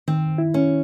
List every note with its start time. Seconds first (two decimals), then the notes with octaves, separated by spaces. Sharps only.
0.08 D#3 C4
0.38 E4
0.54 C#4